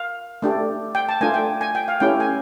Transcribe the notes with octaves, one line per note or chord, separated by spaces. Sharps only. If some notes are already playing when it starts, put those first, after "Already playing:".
Already playing: F5
A3 D4 G4
G5
A5
A3 D4 F4 G#5
G5
G#5
G5
F5
A3 C#4 E4 G4 G5
G#5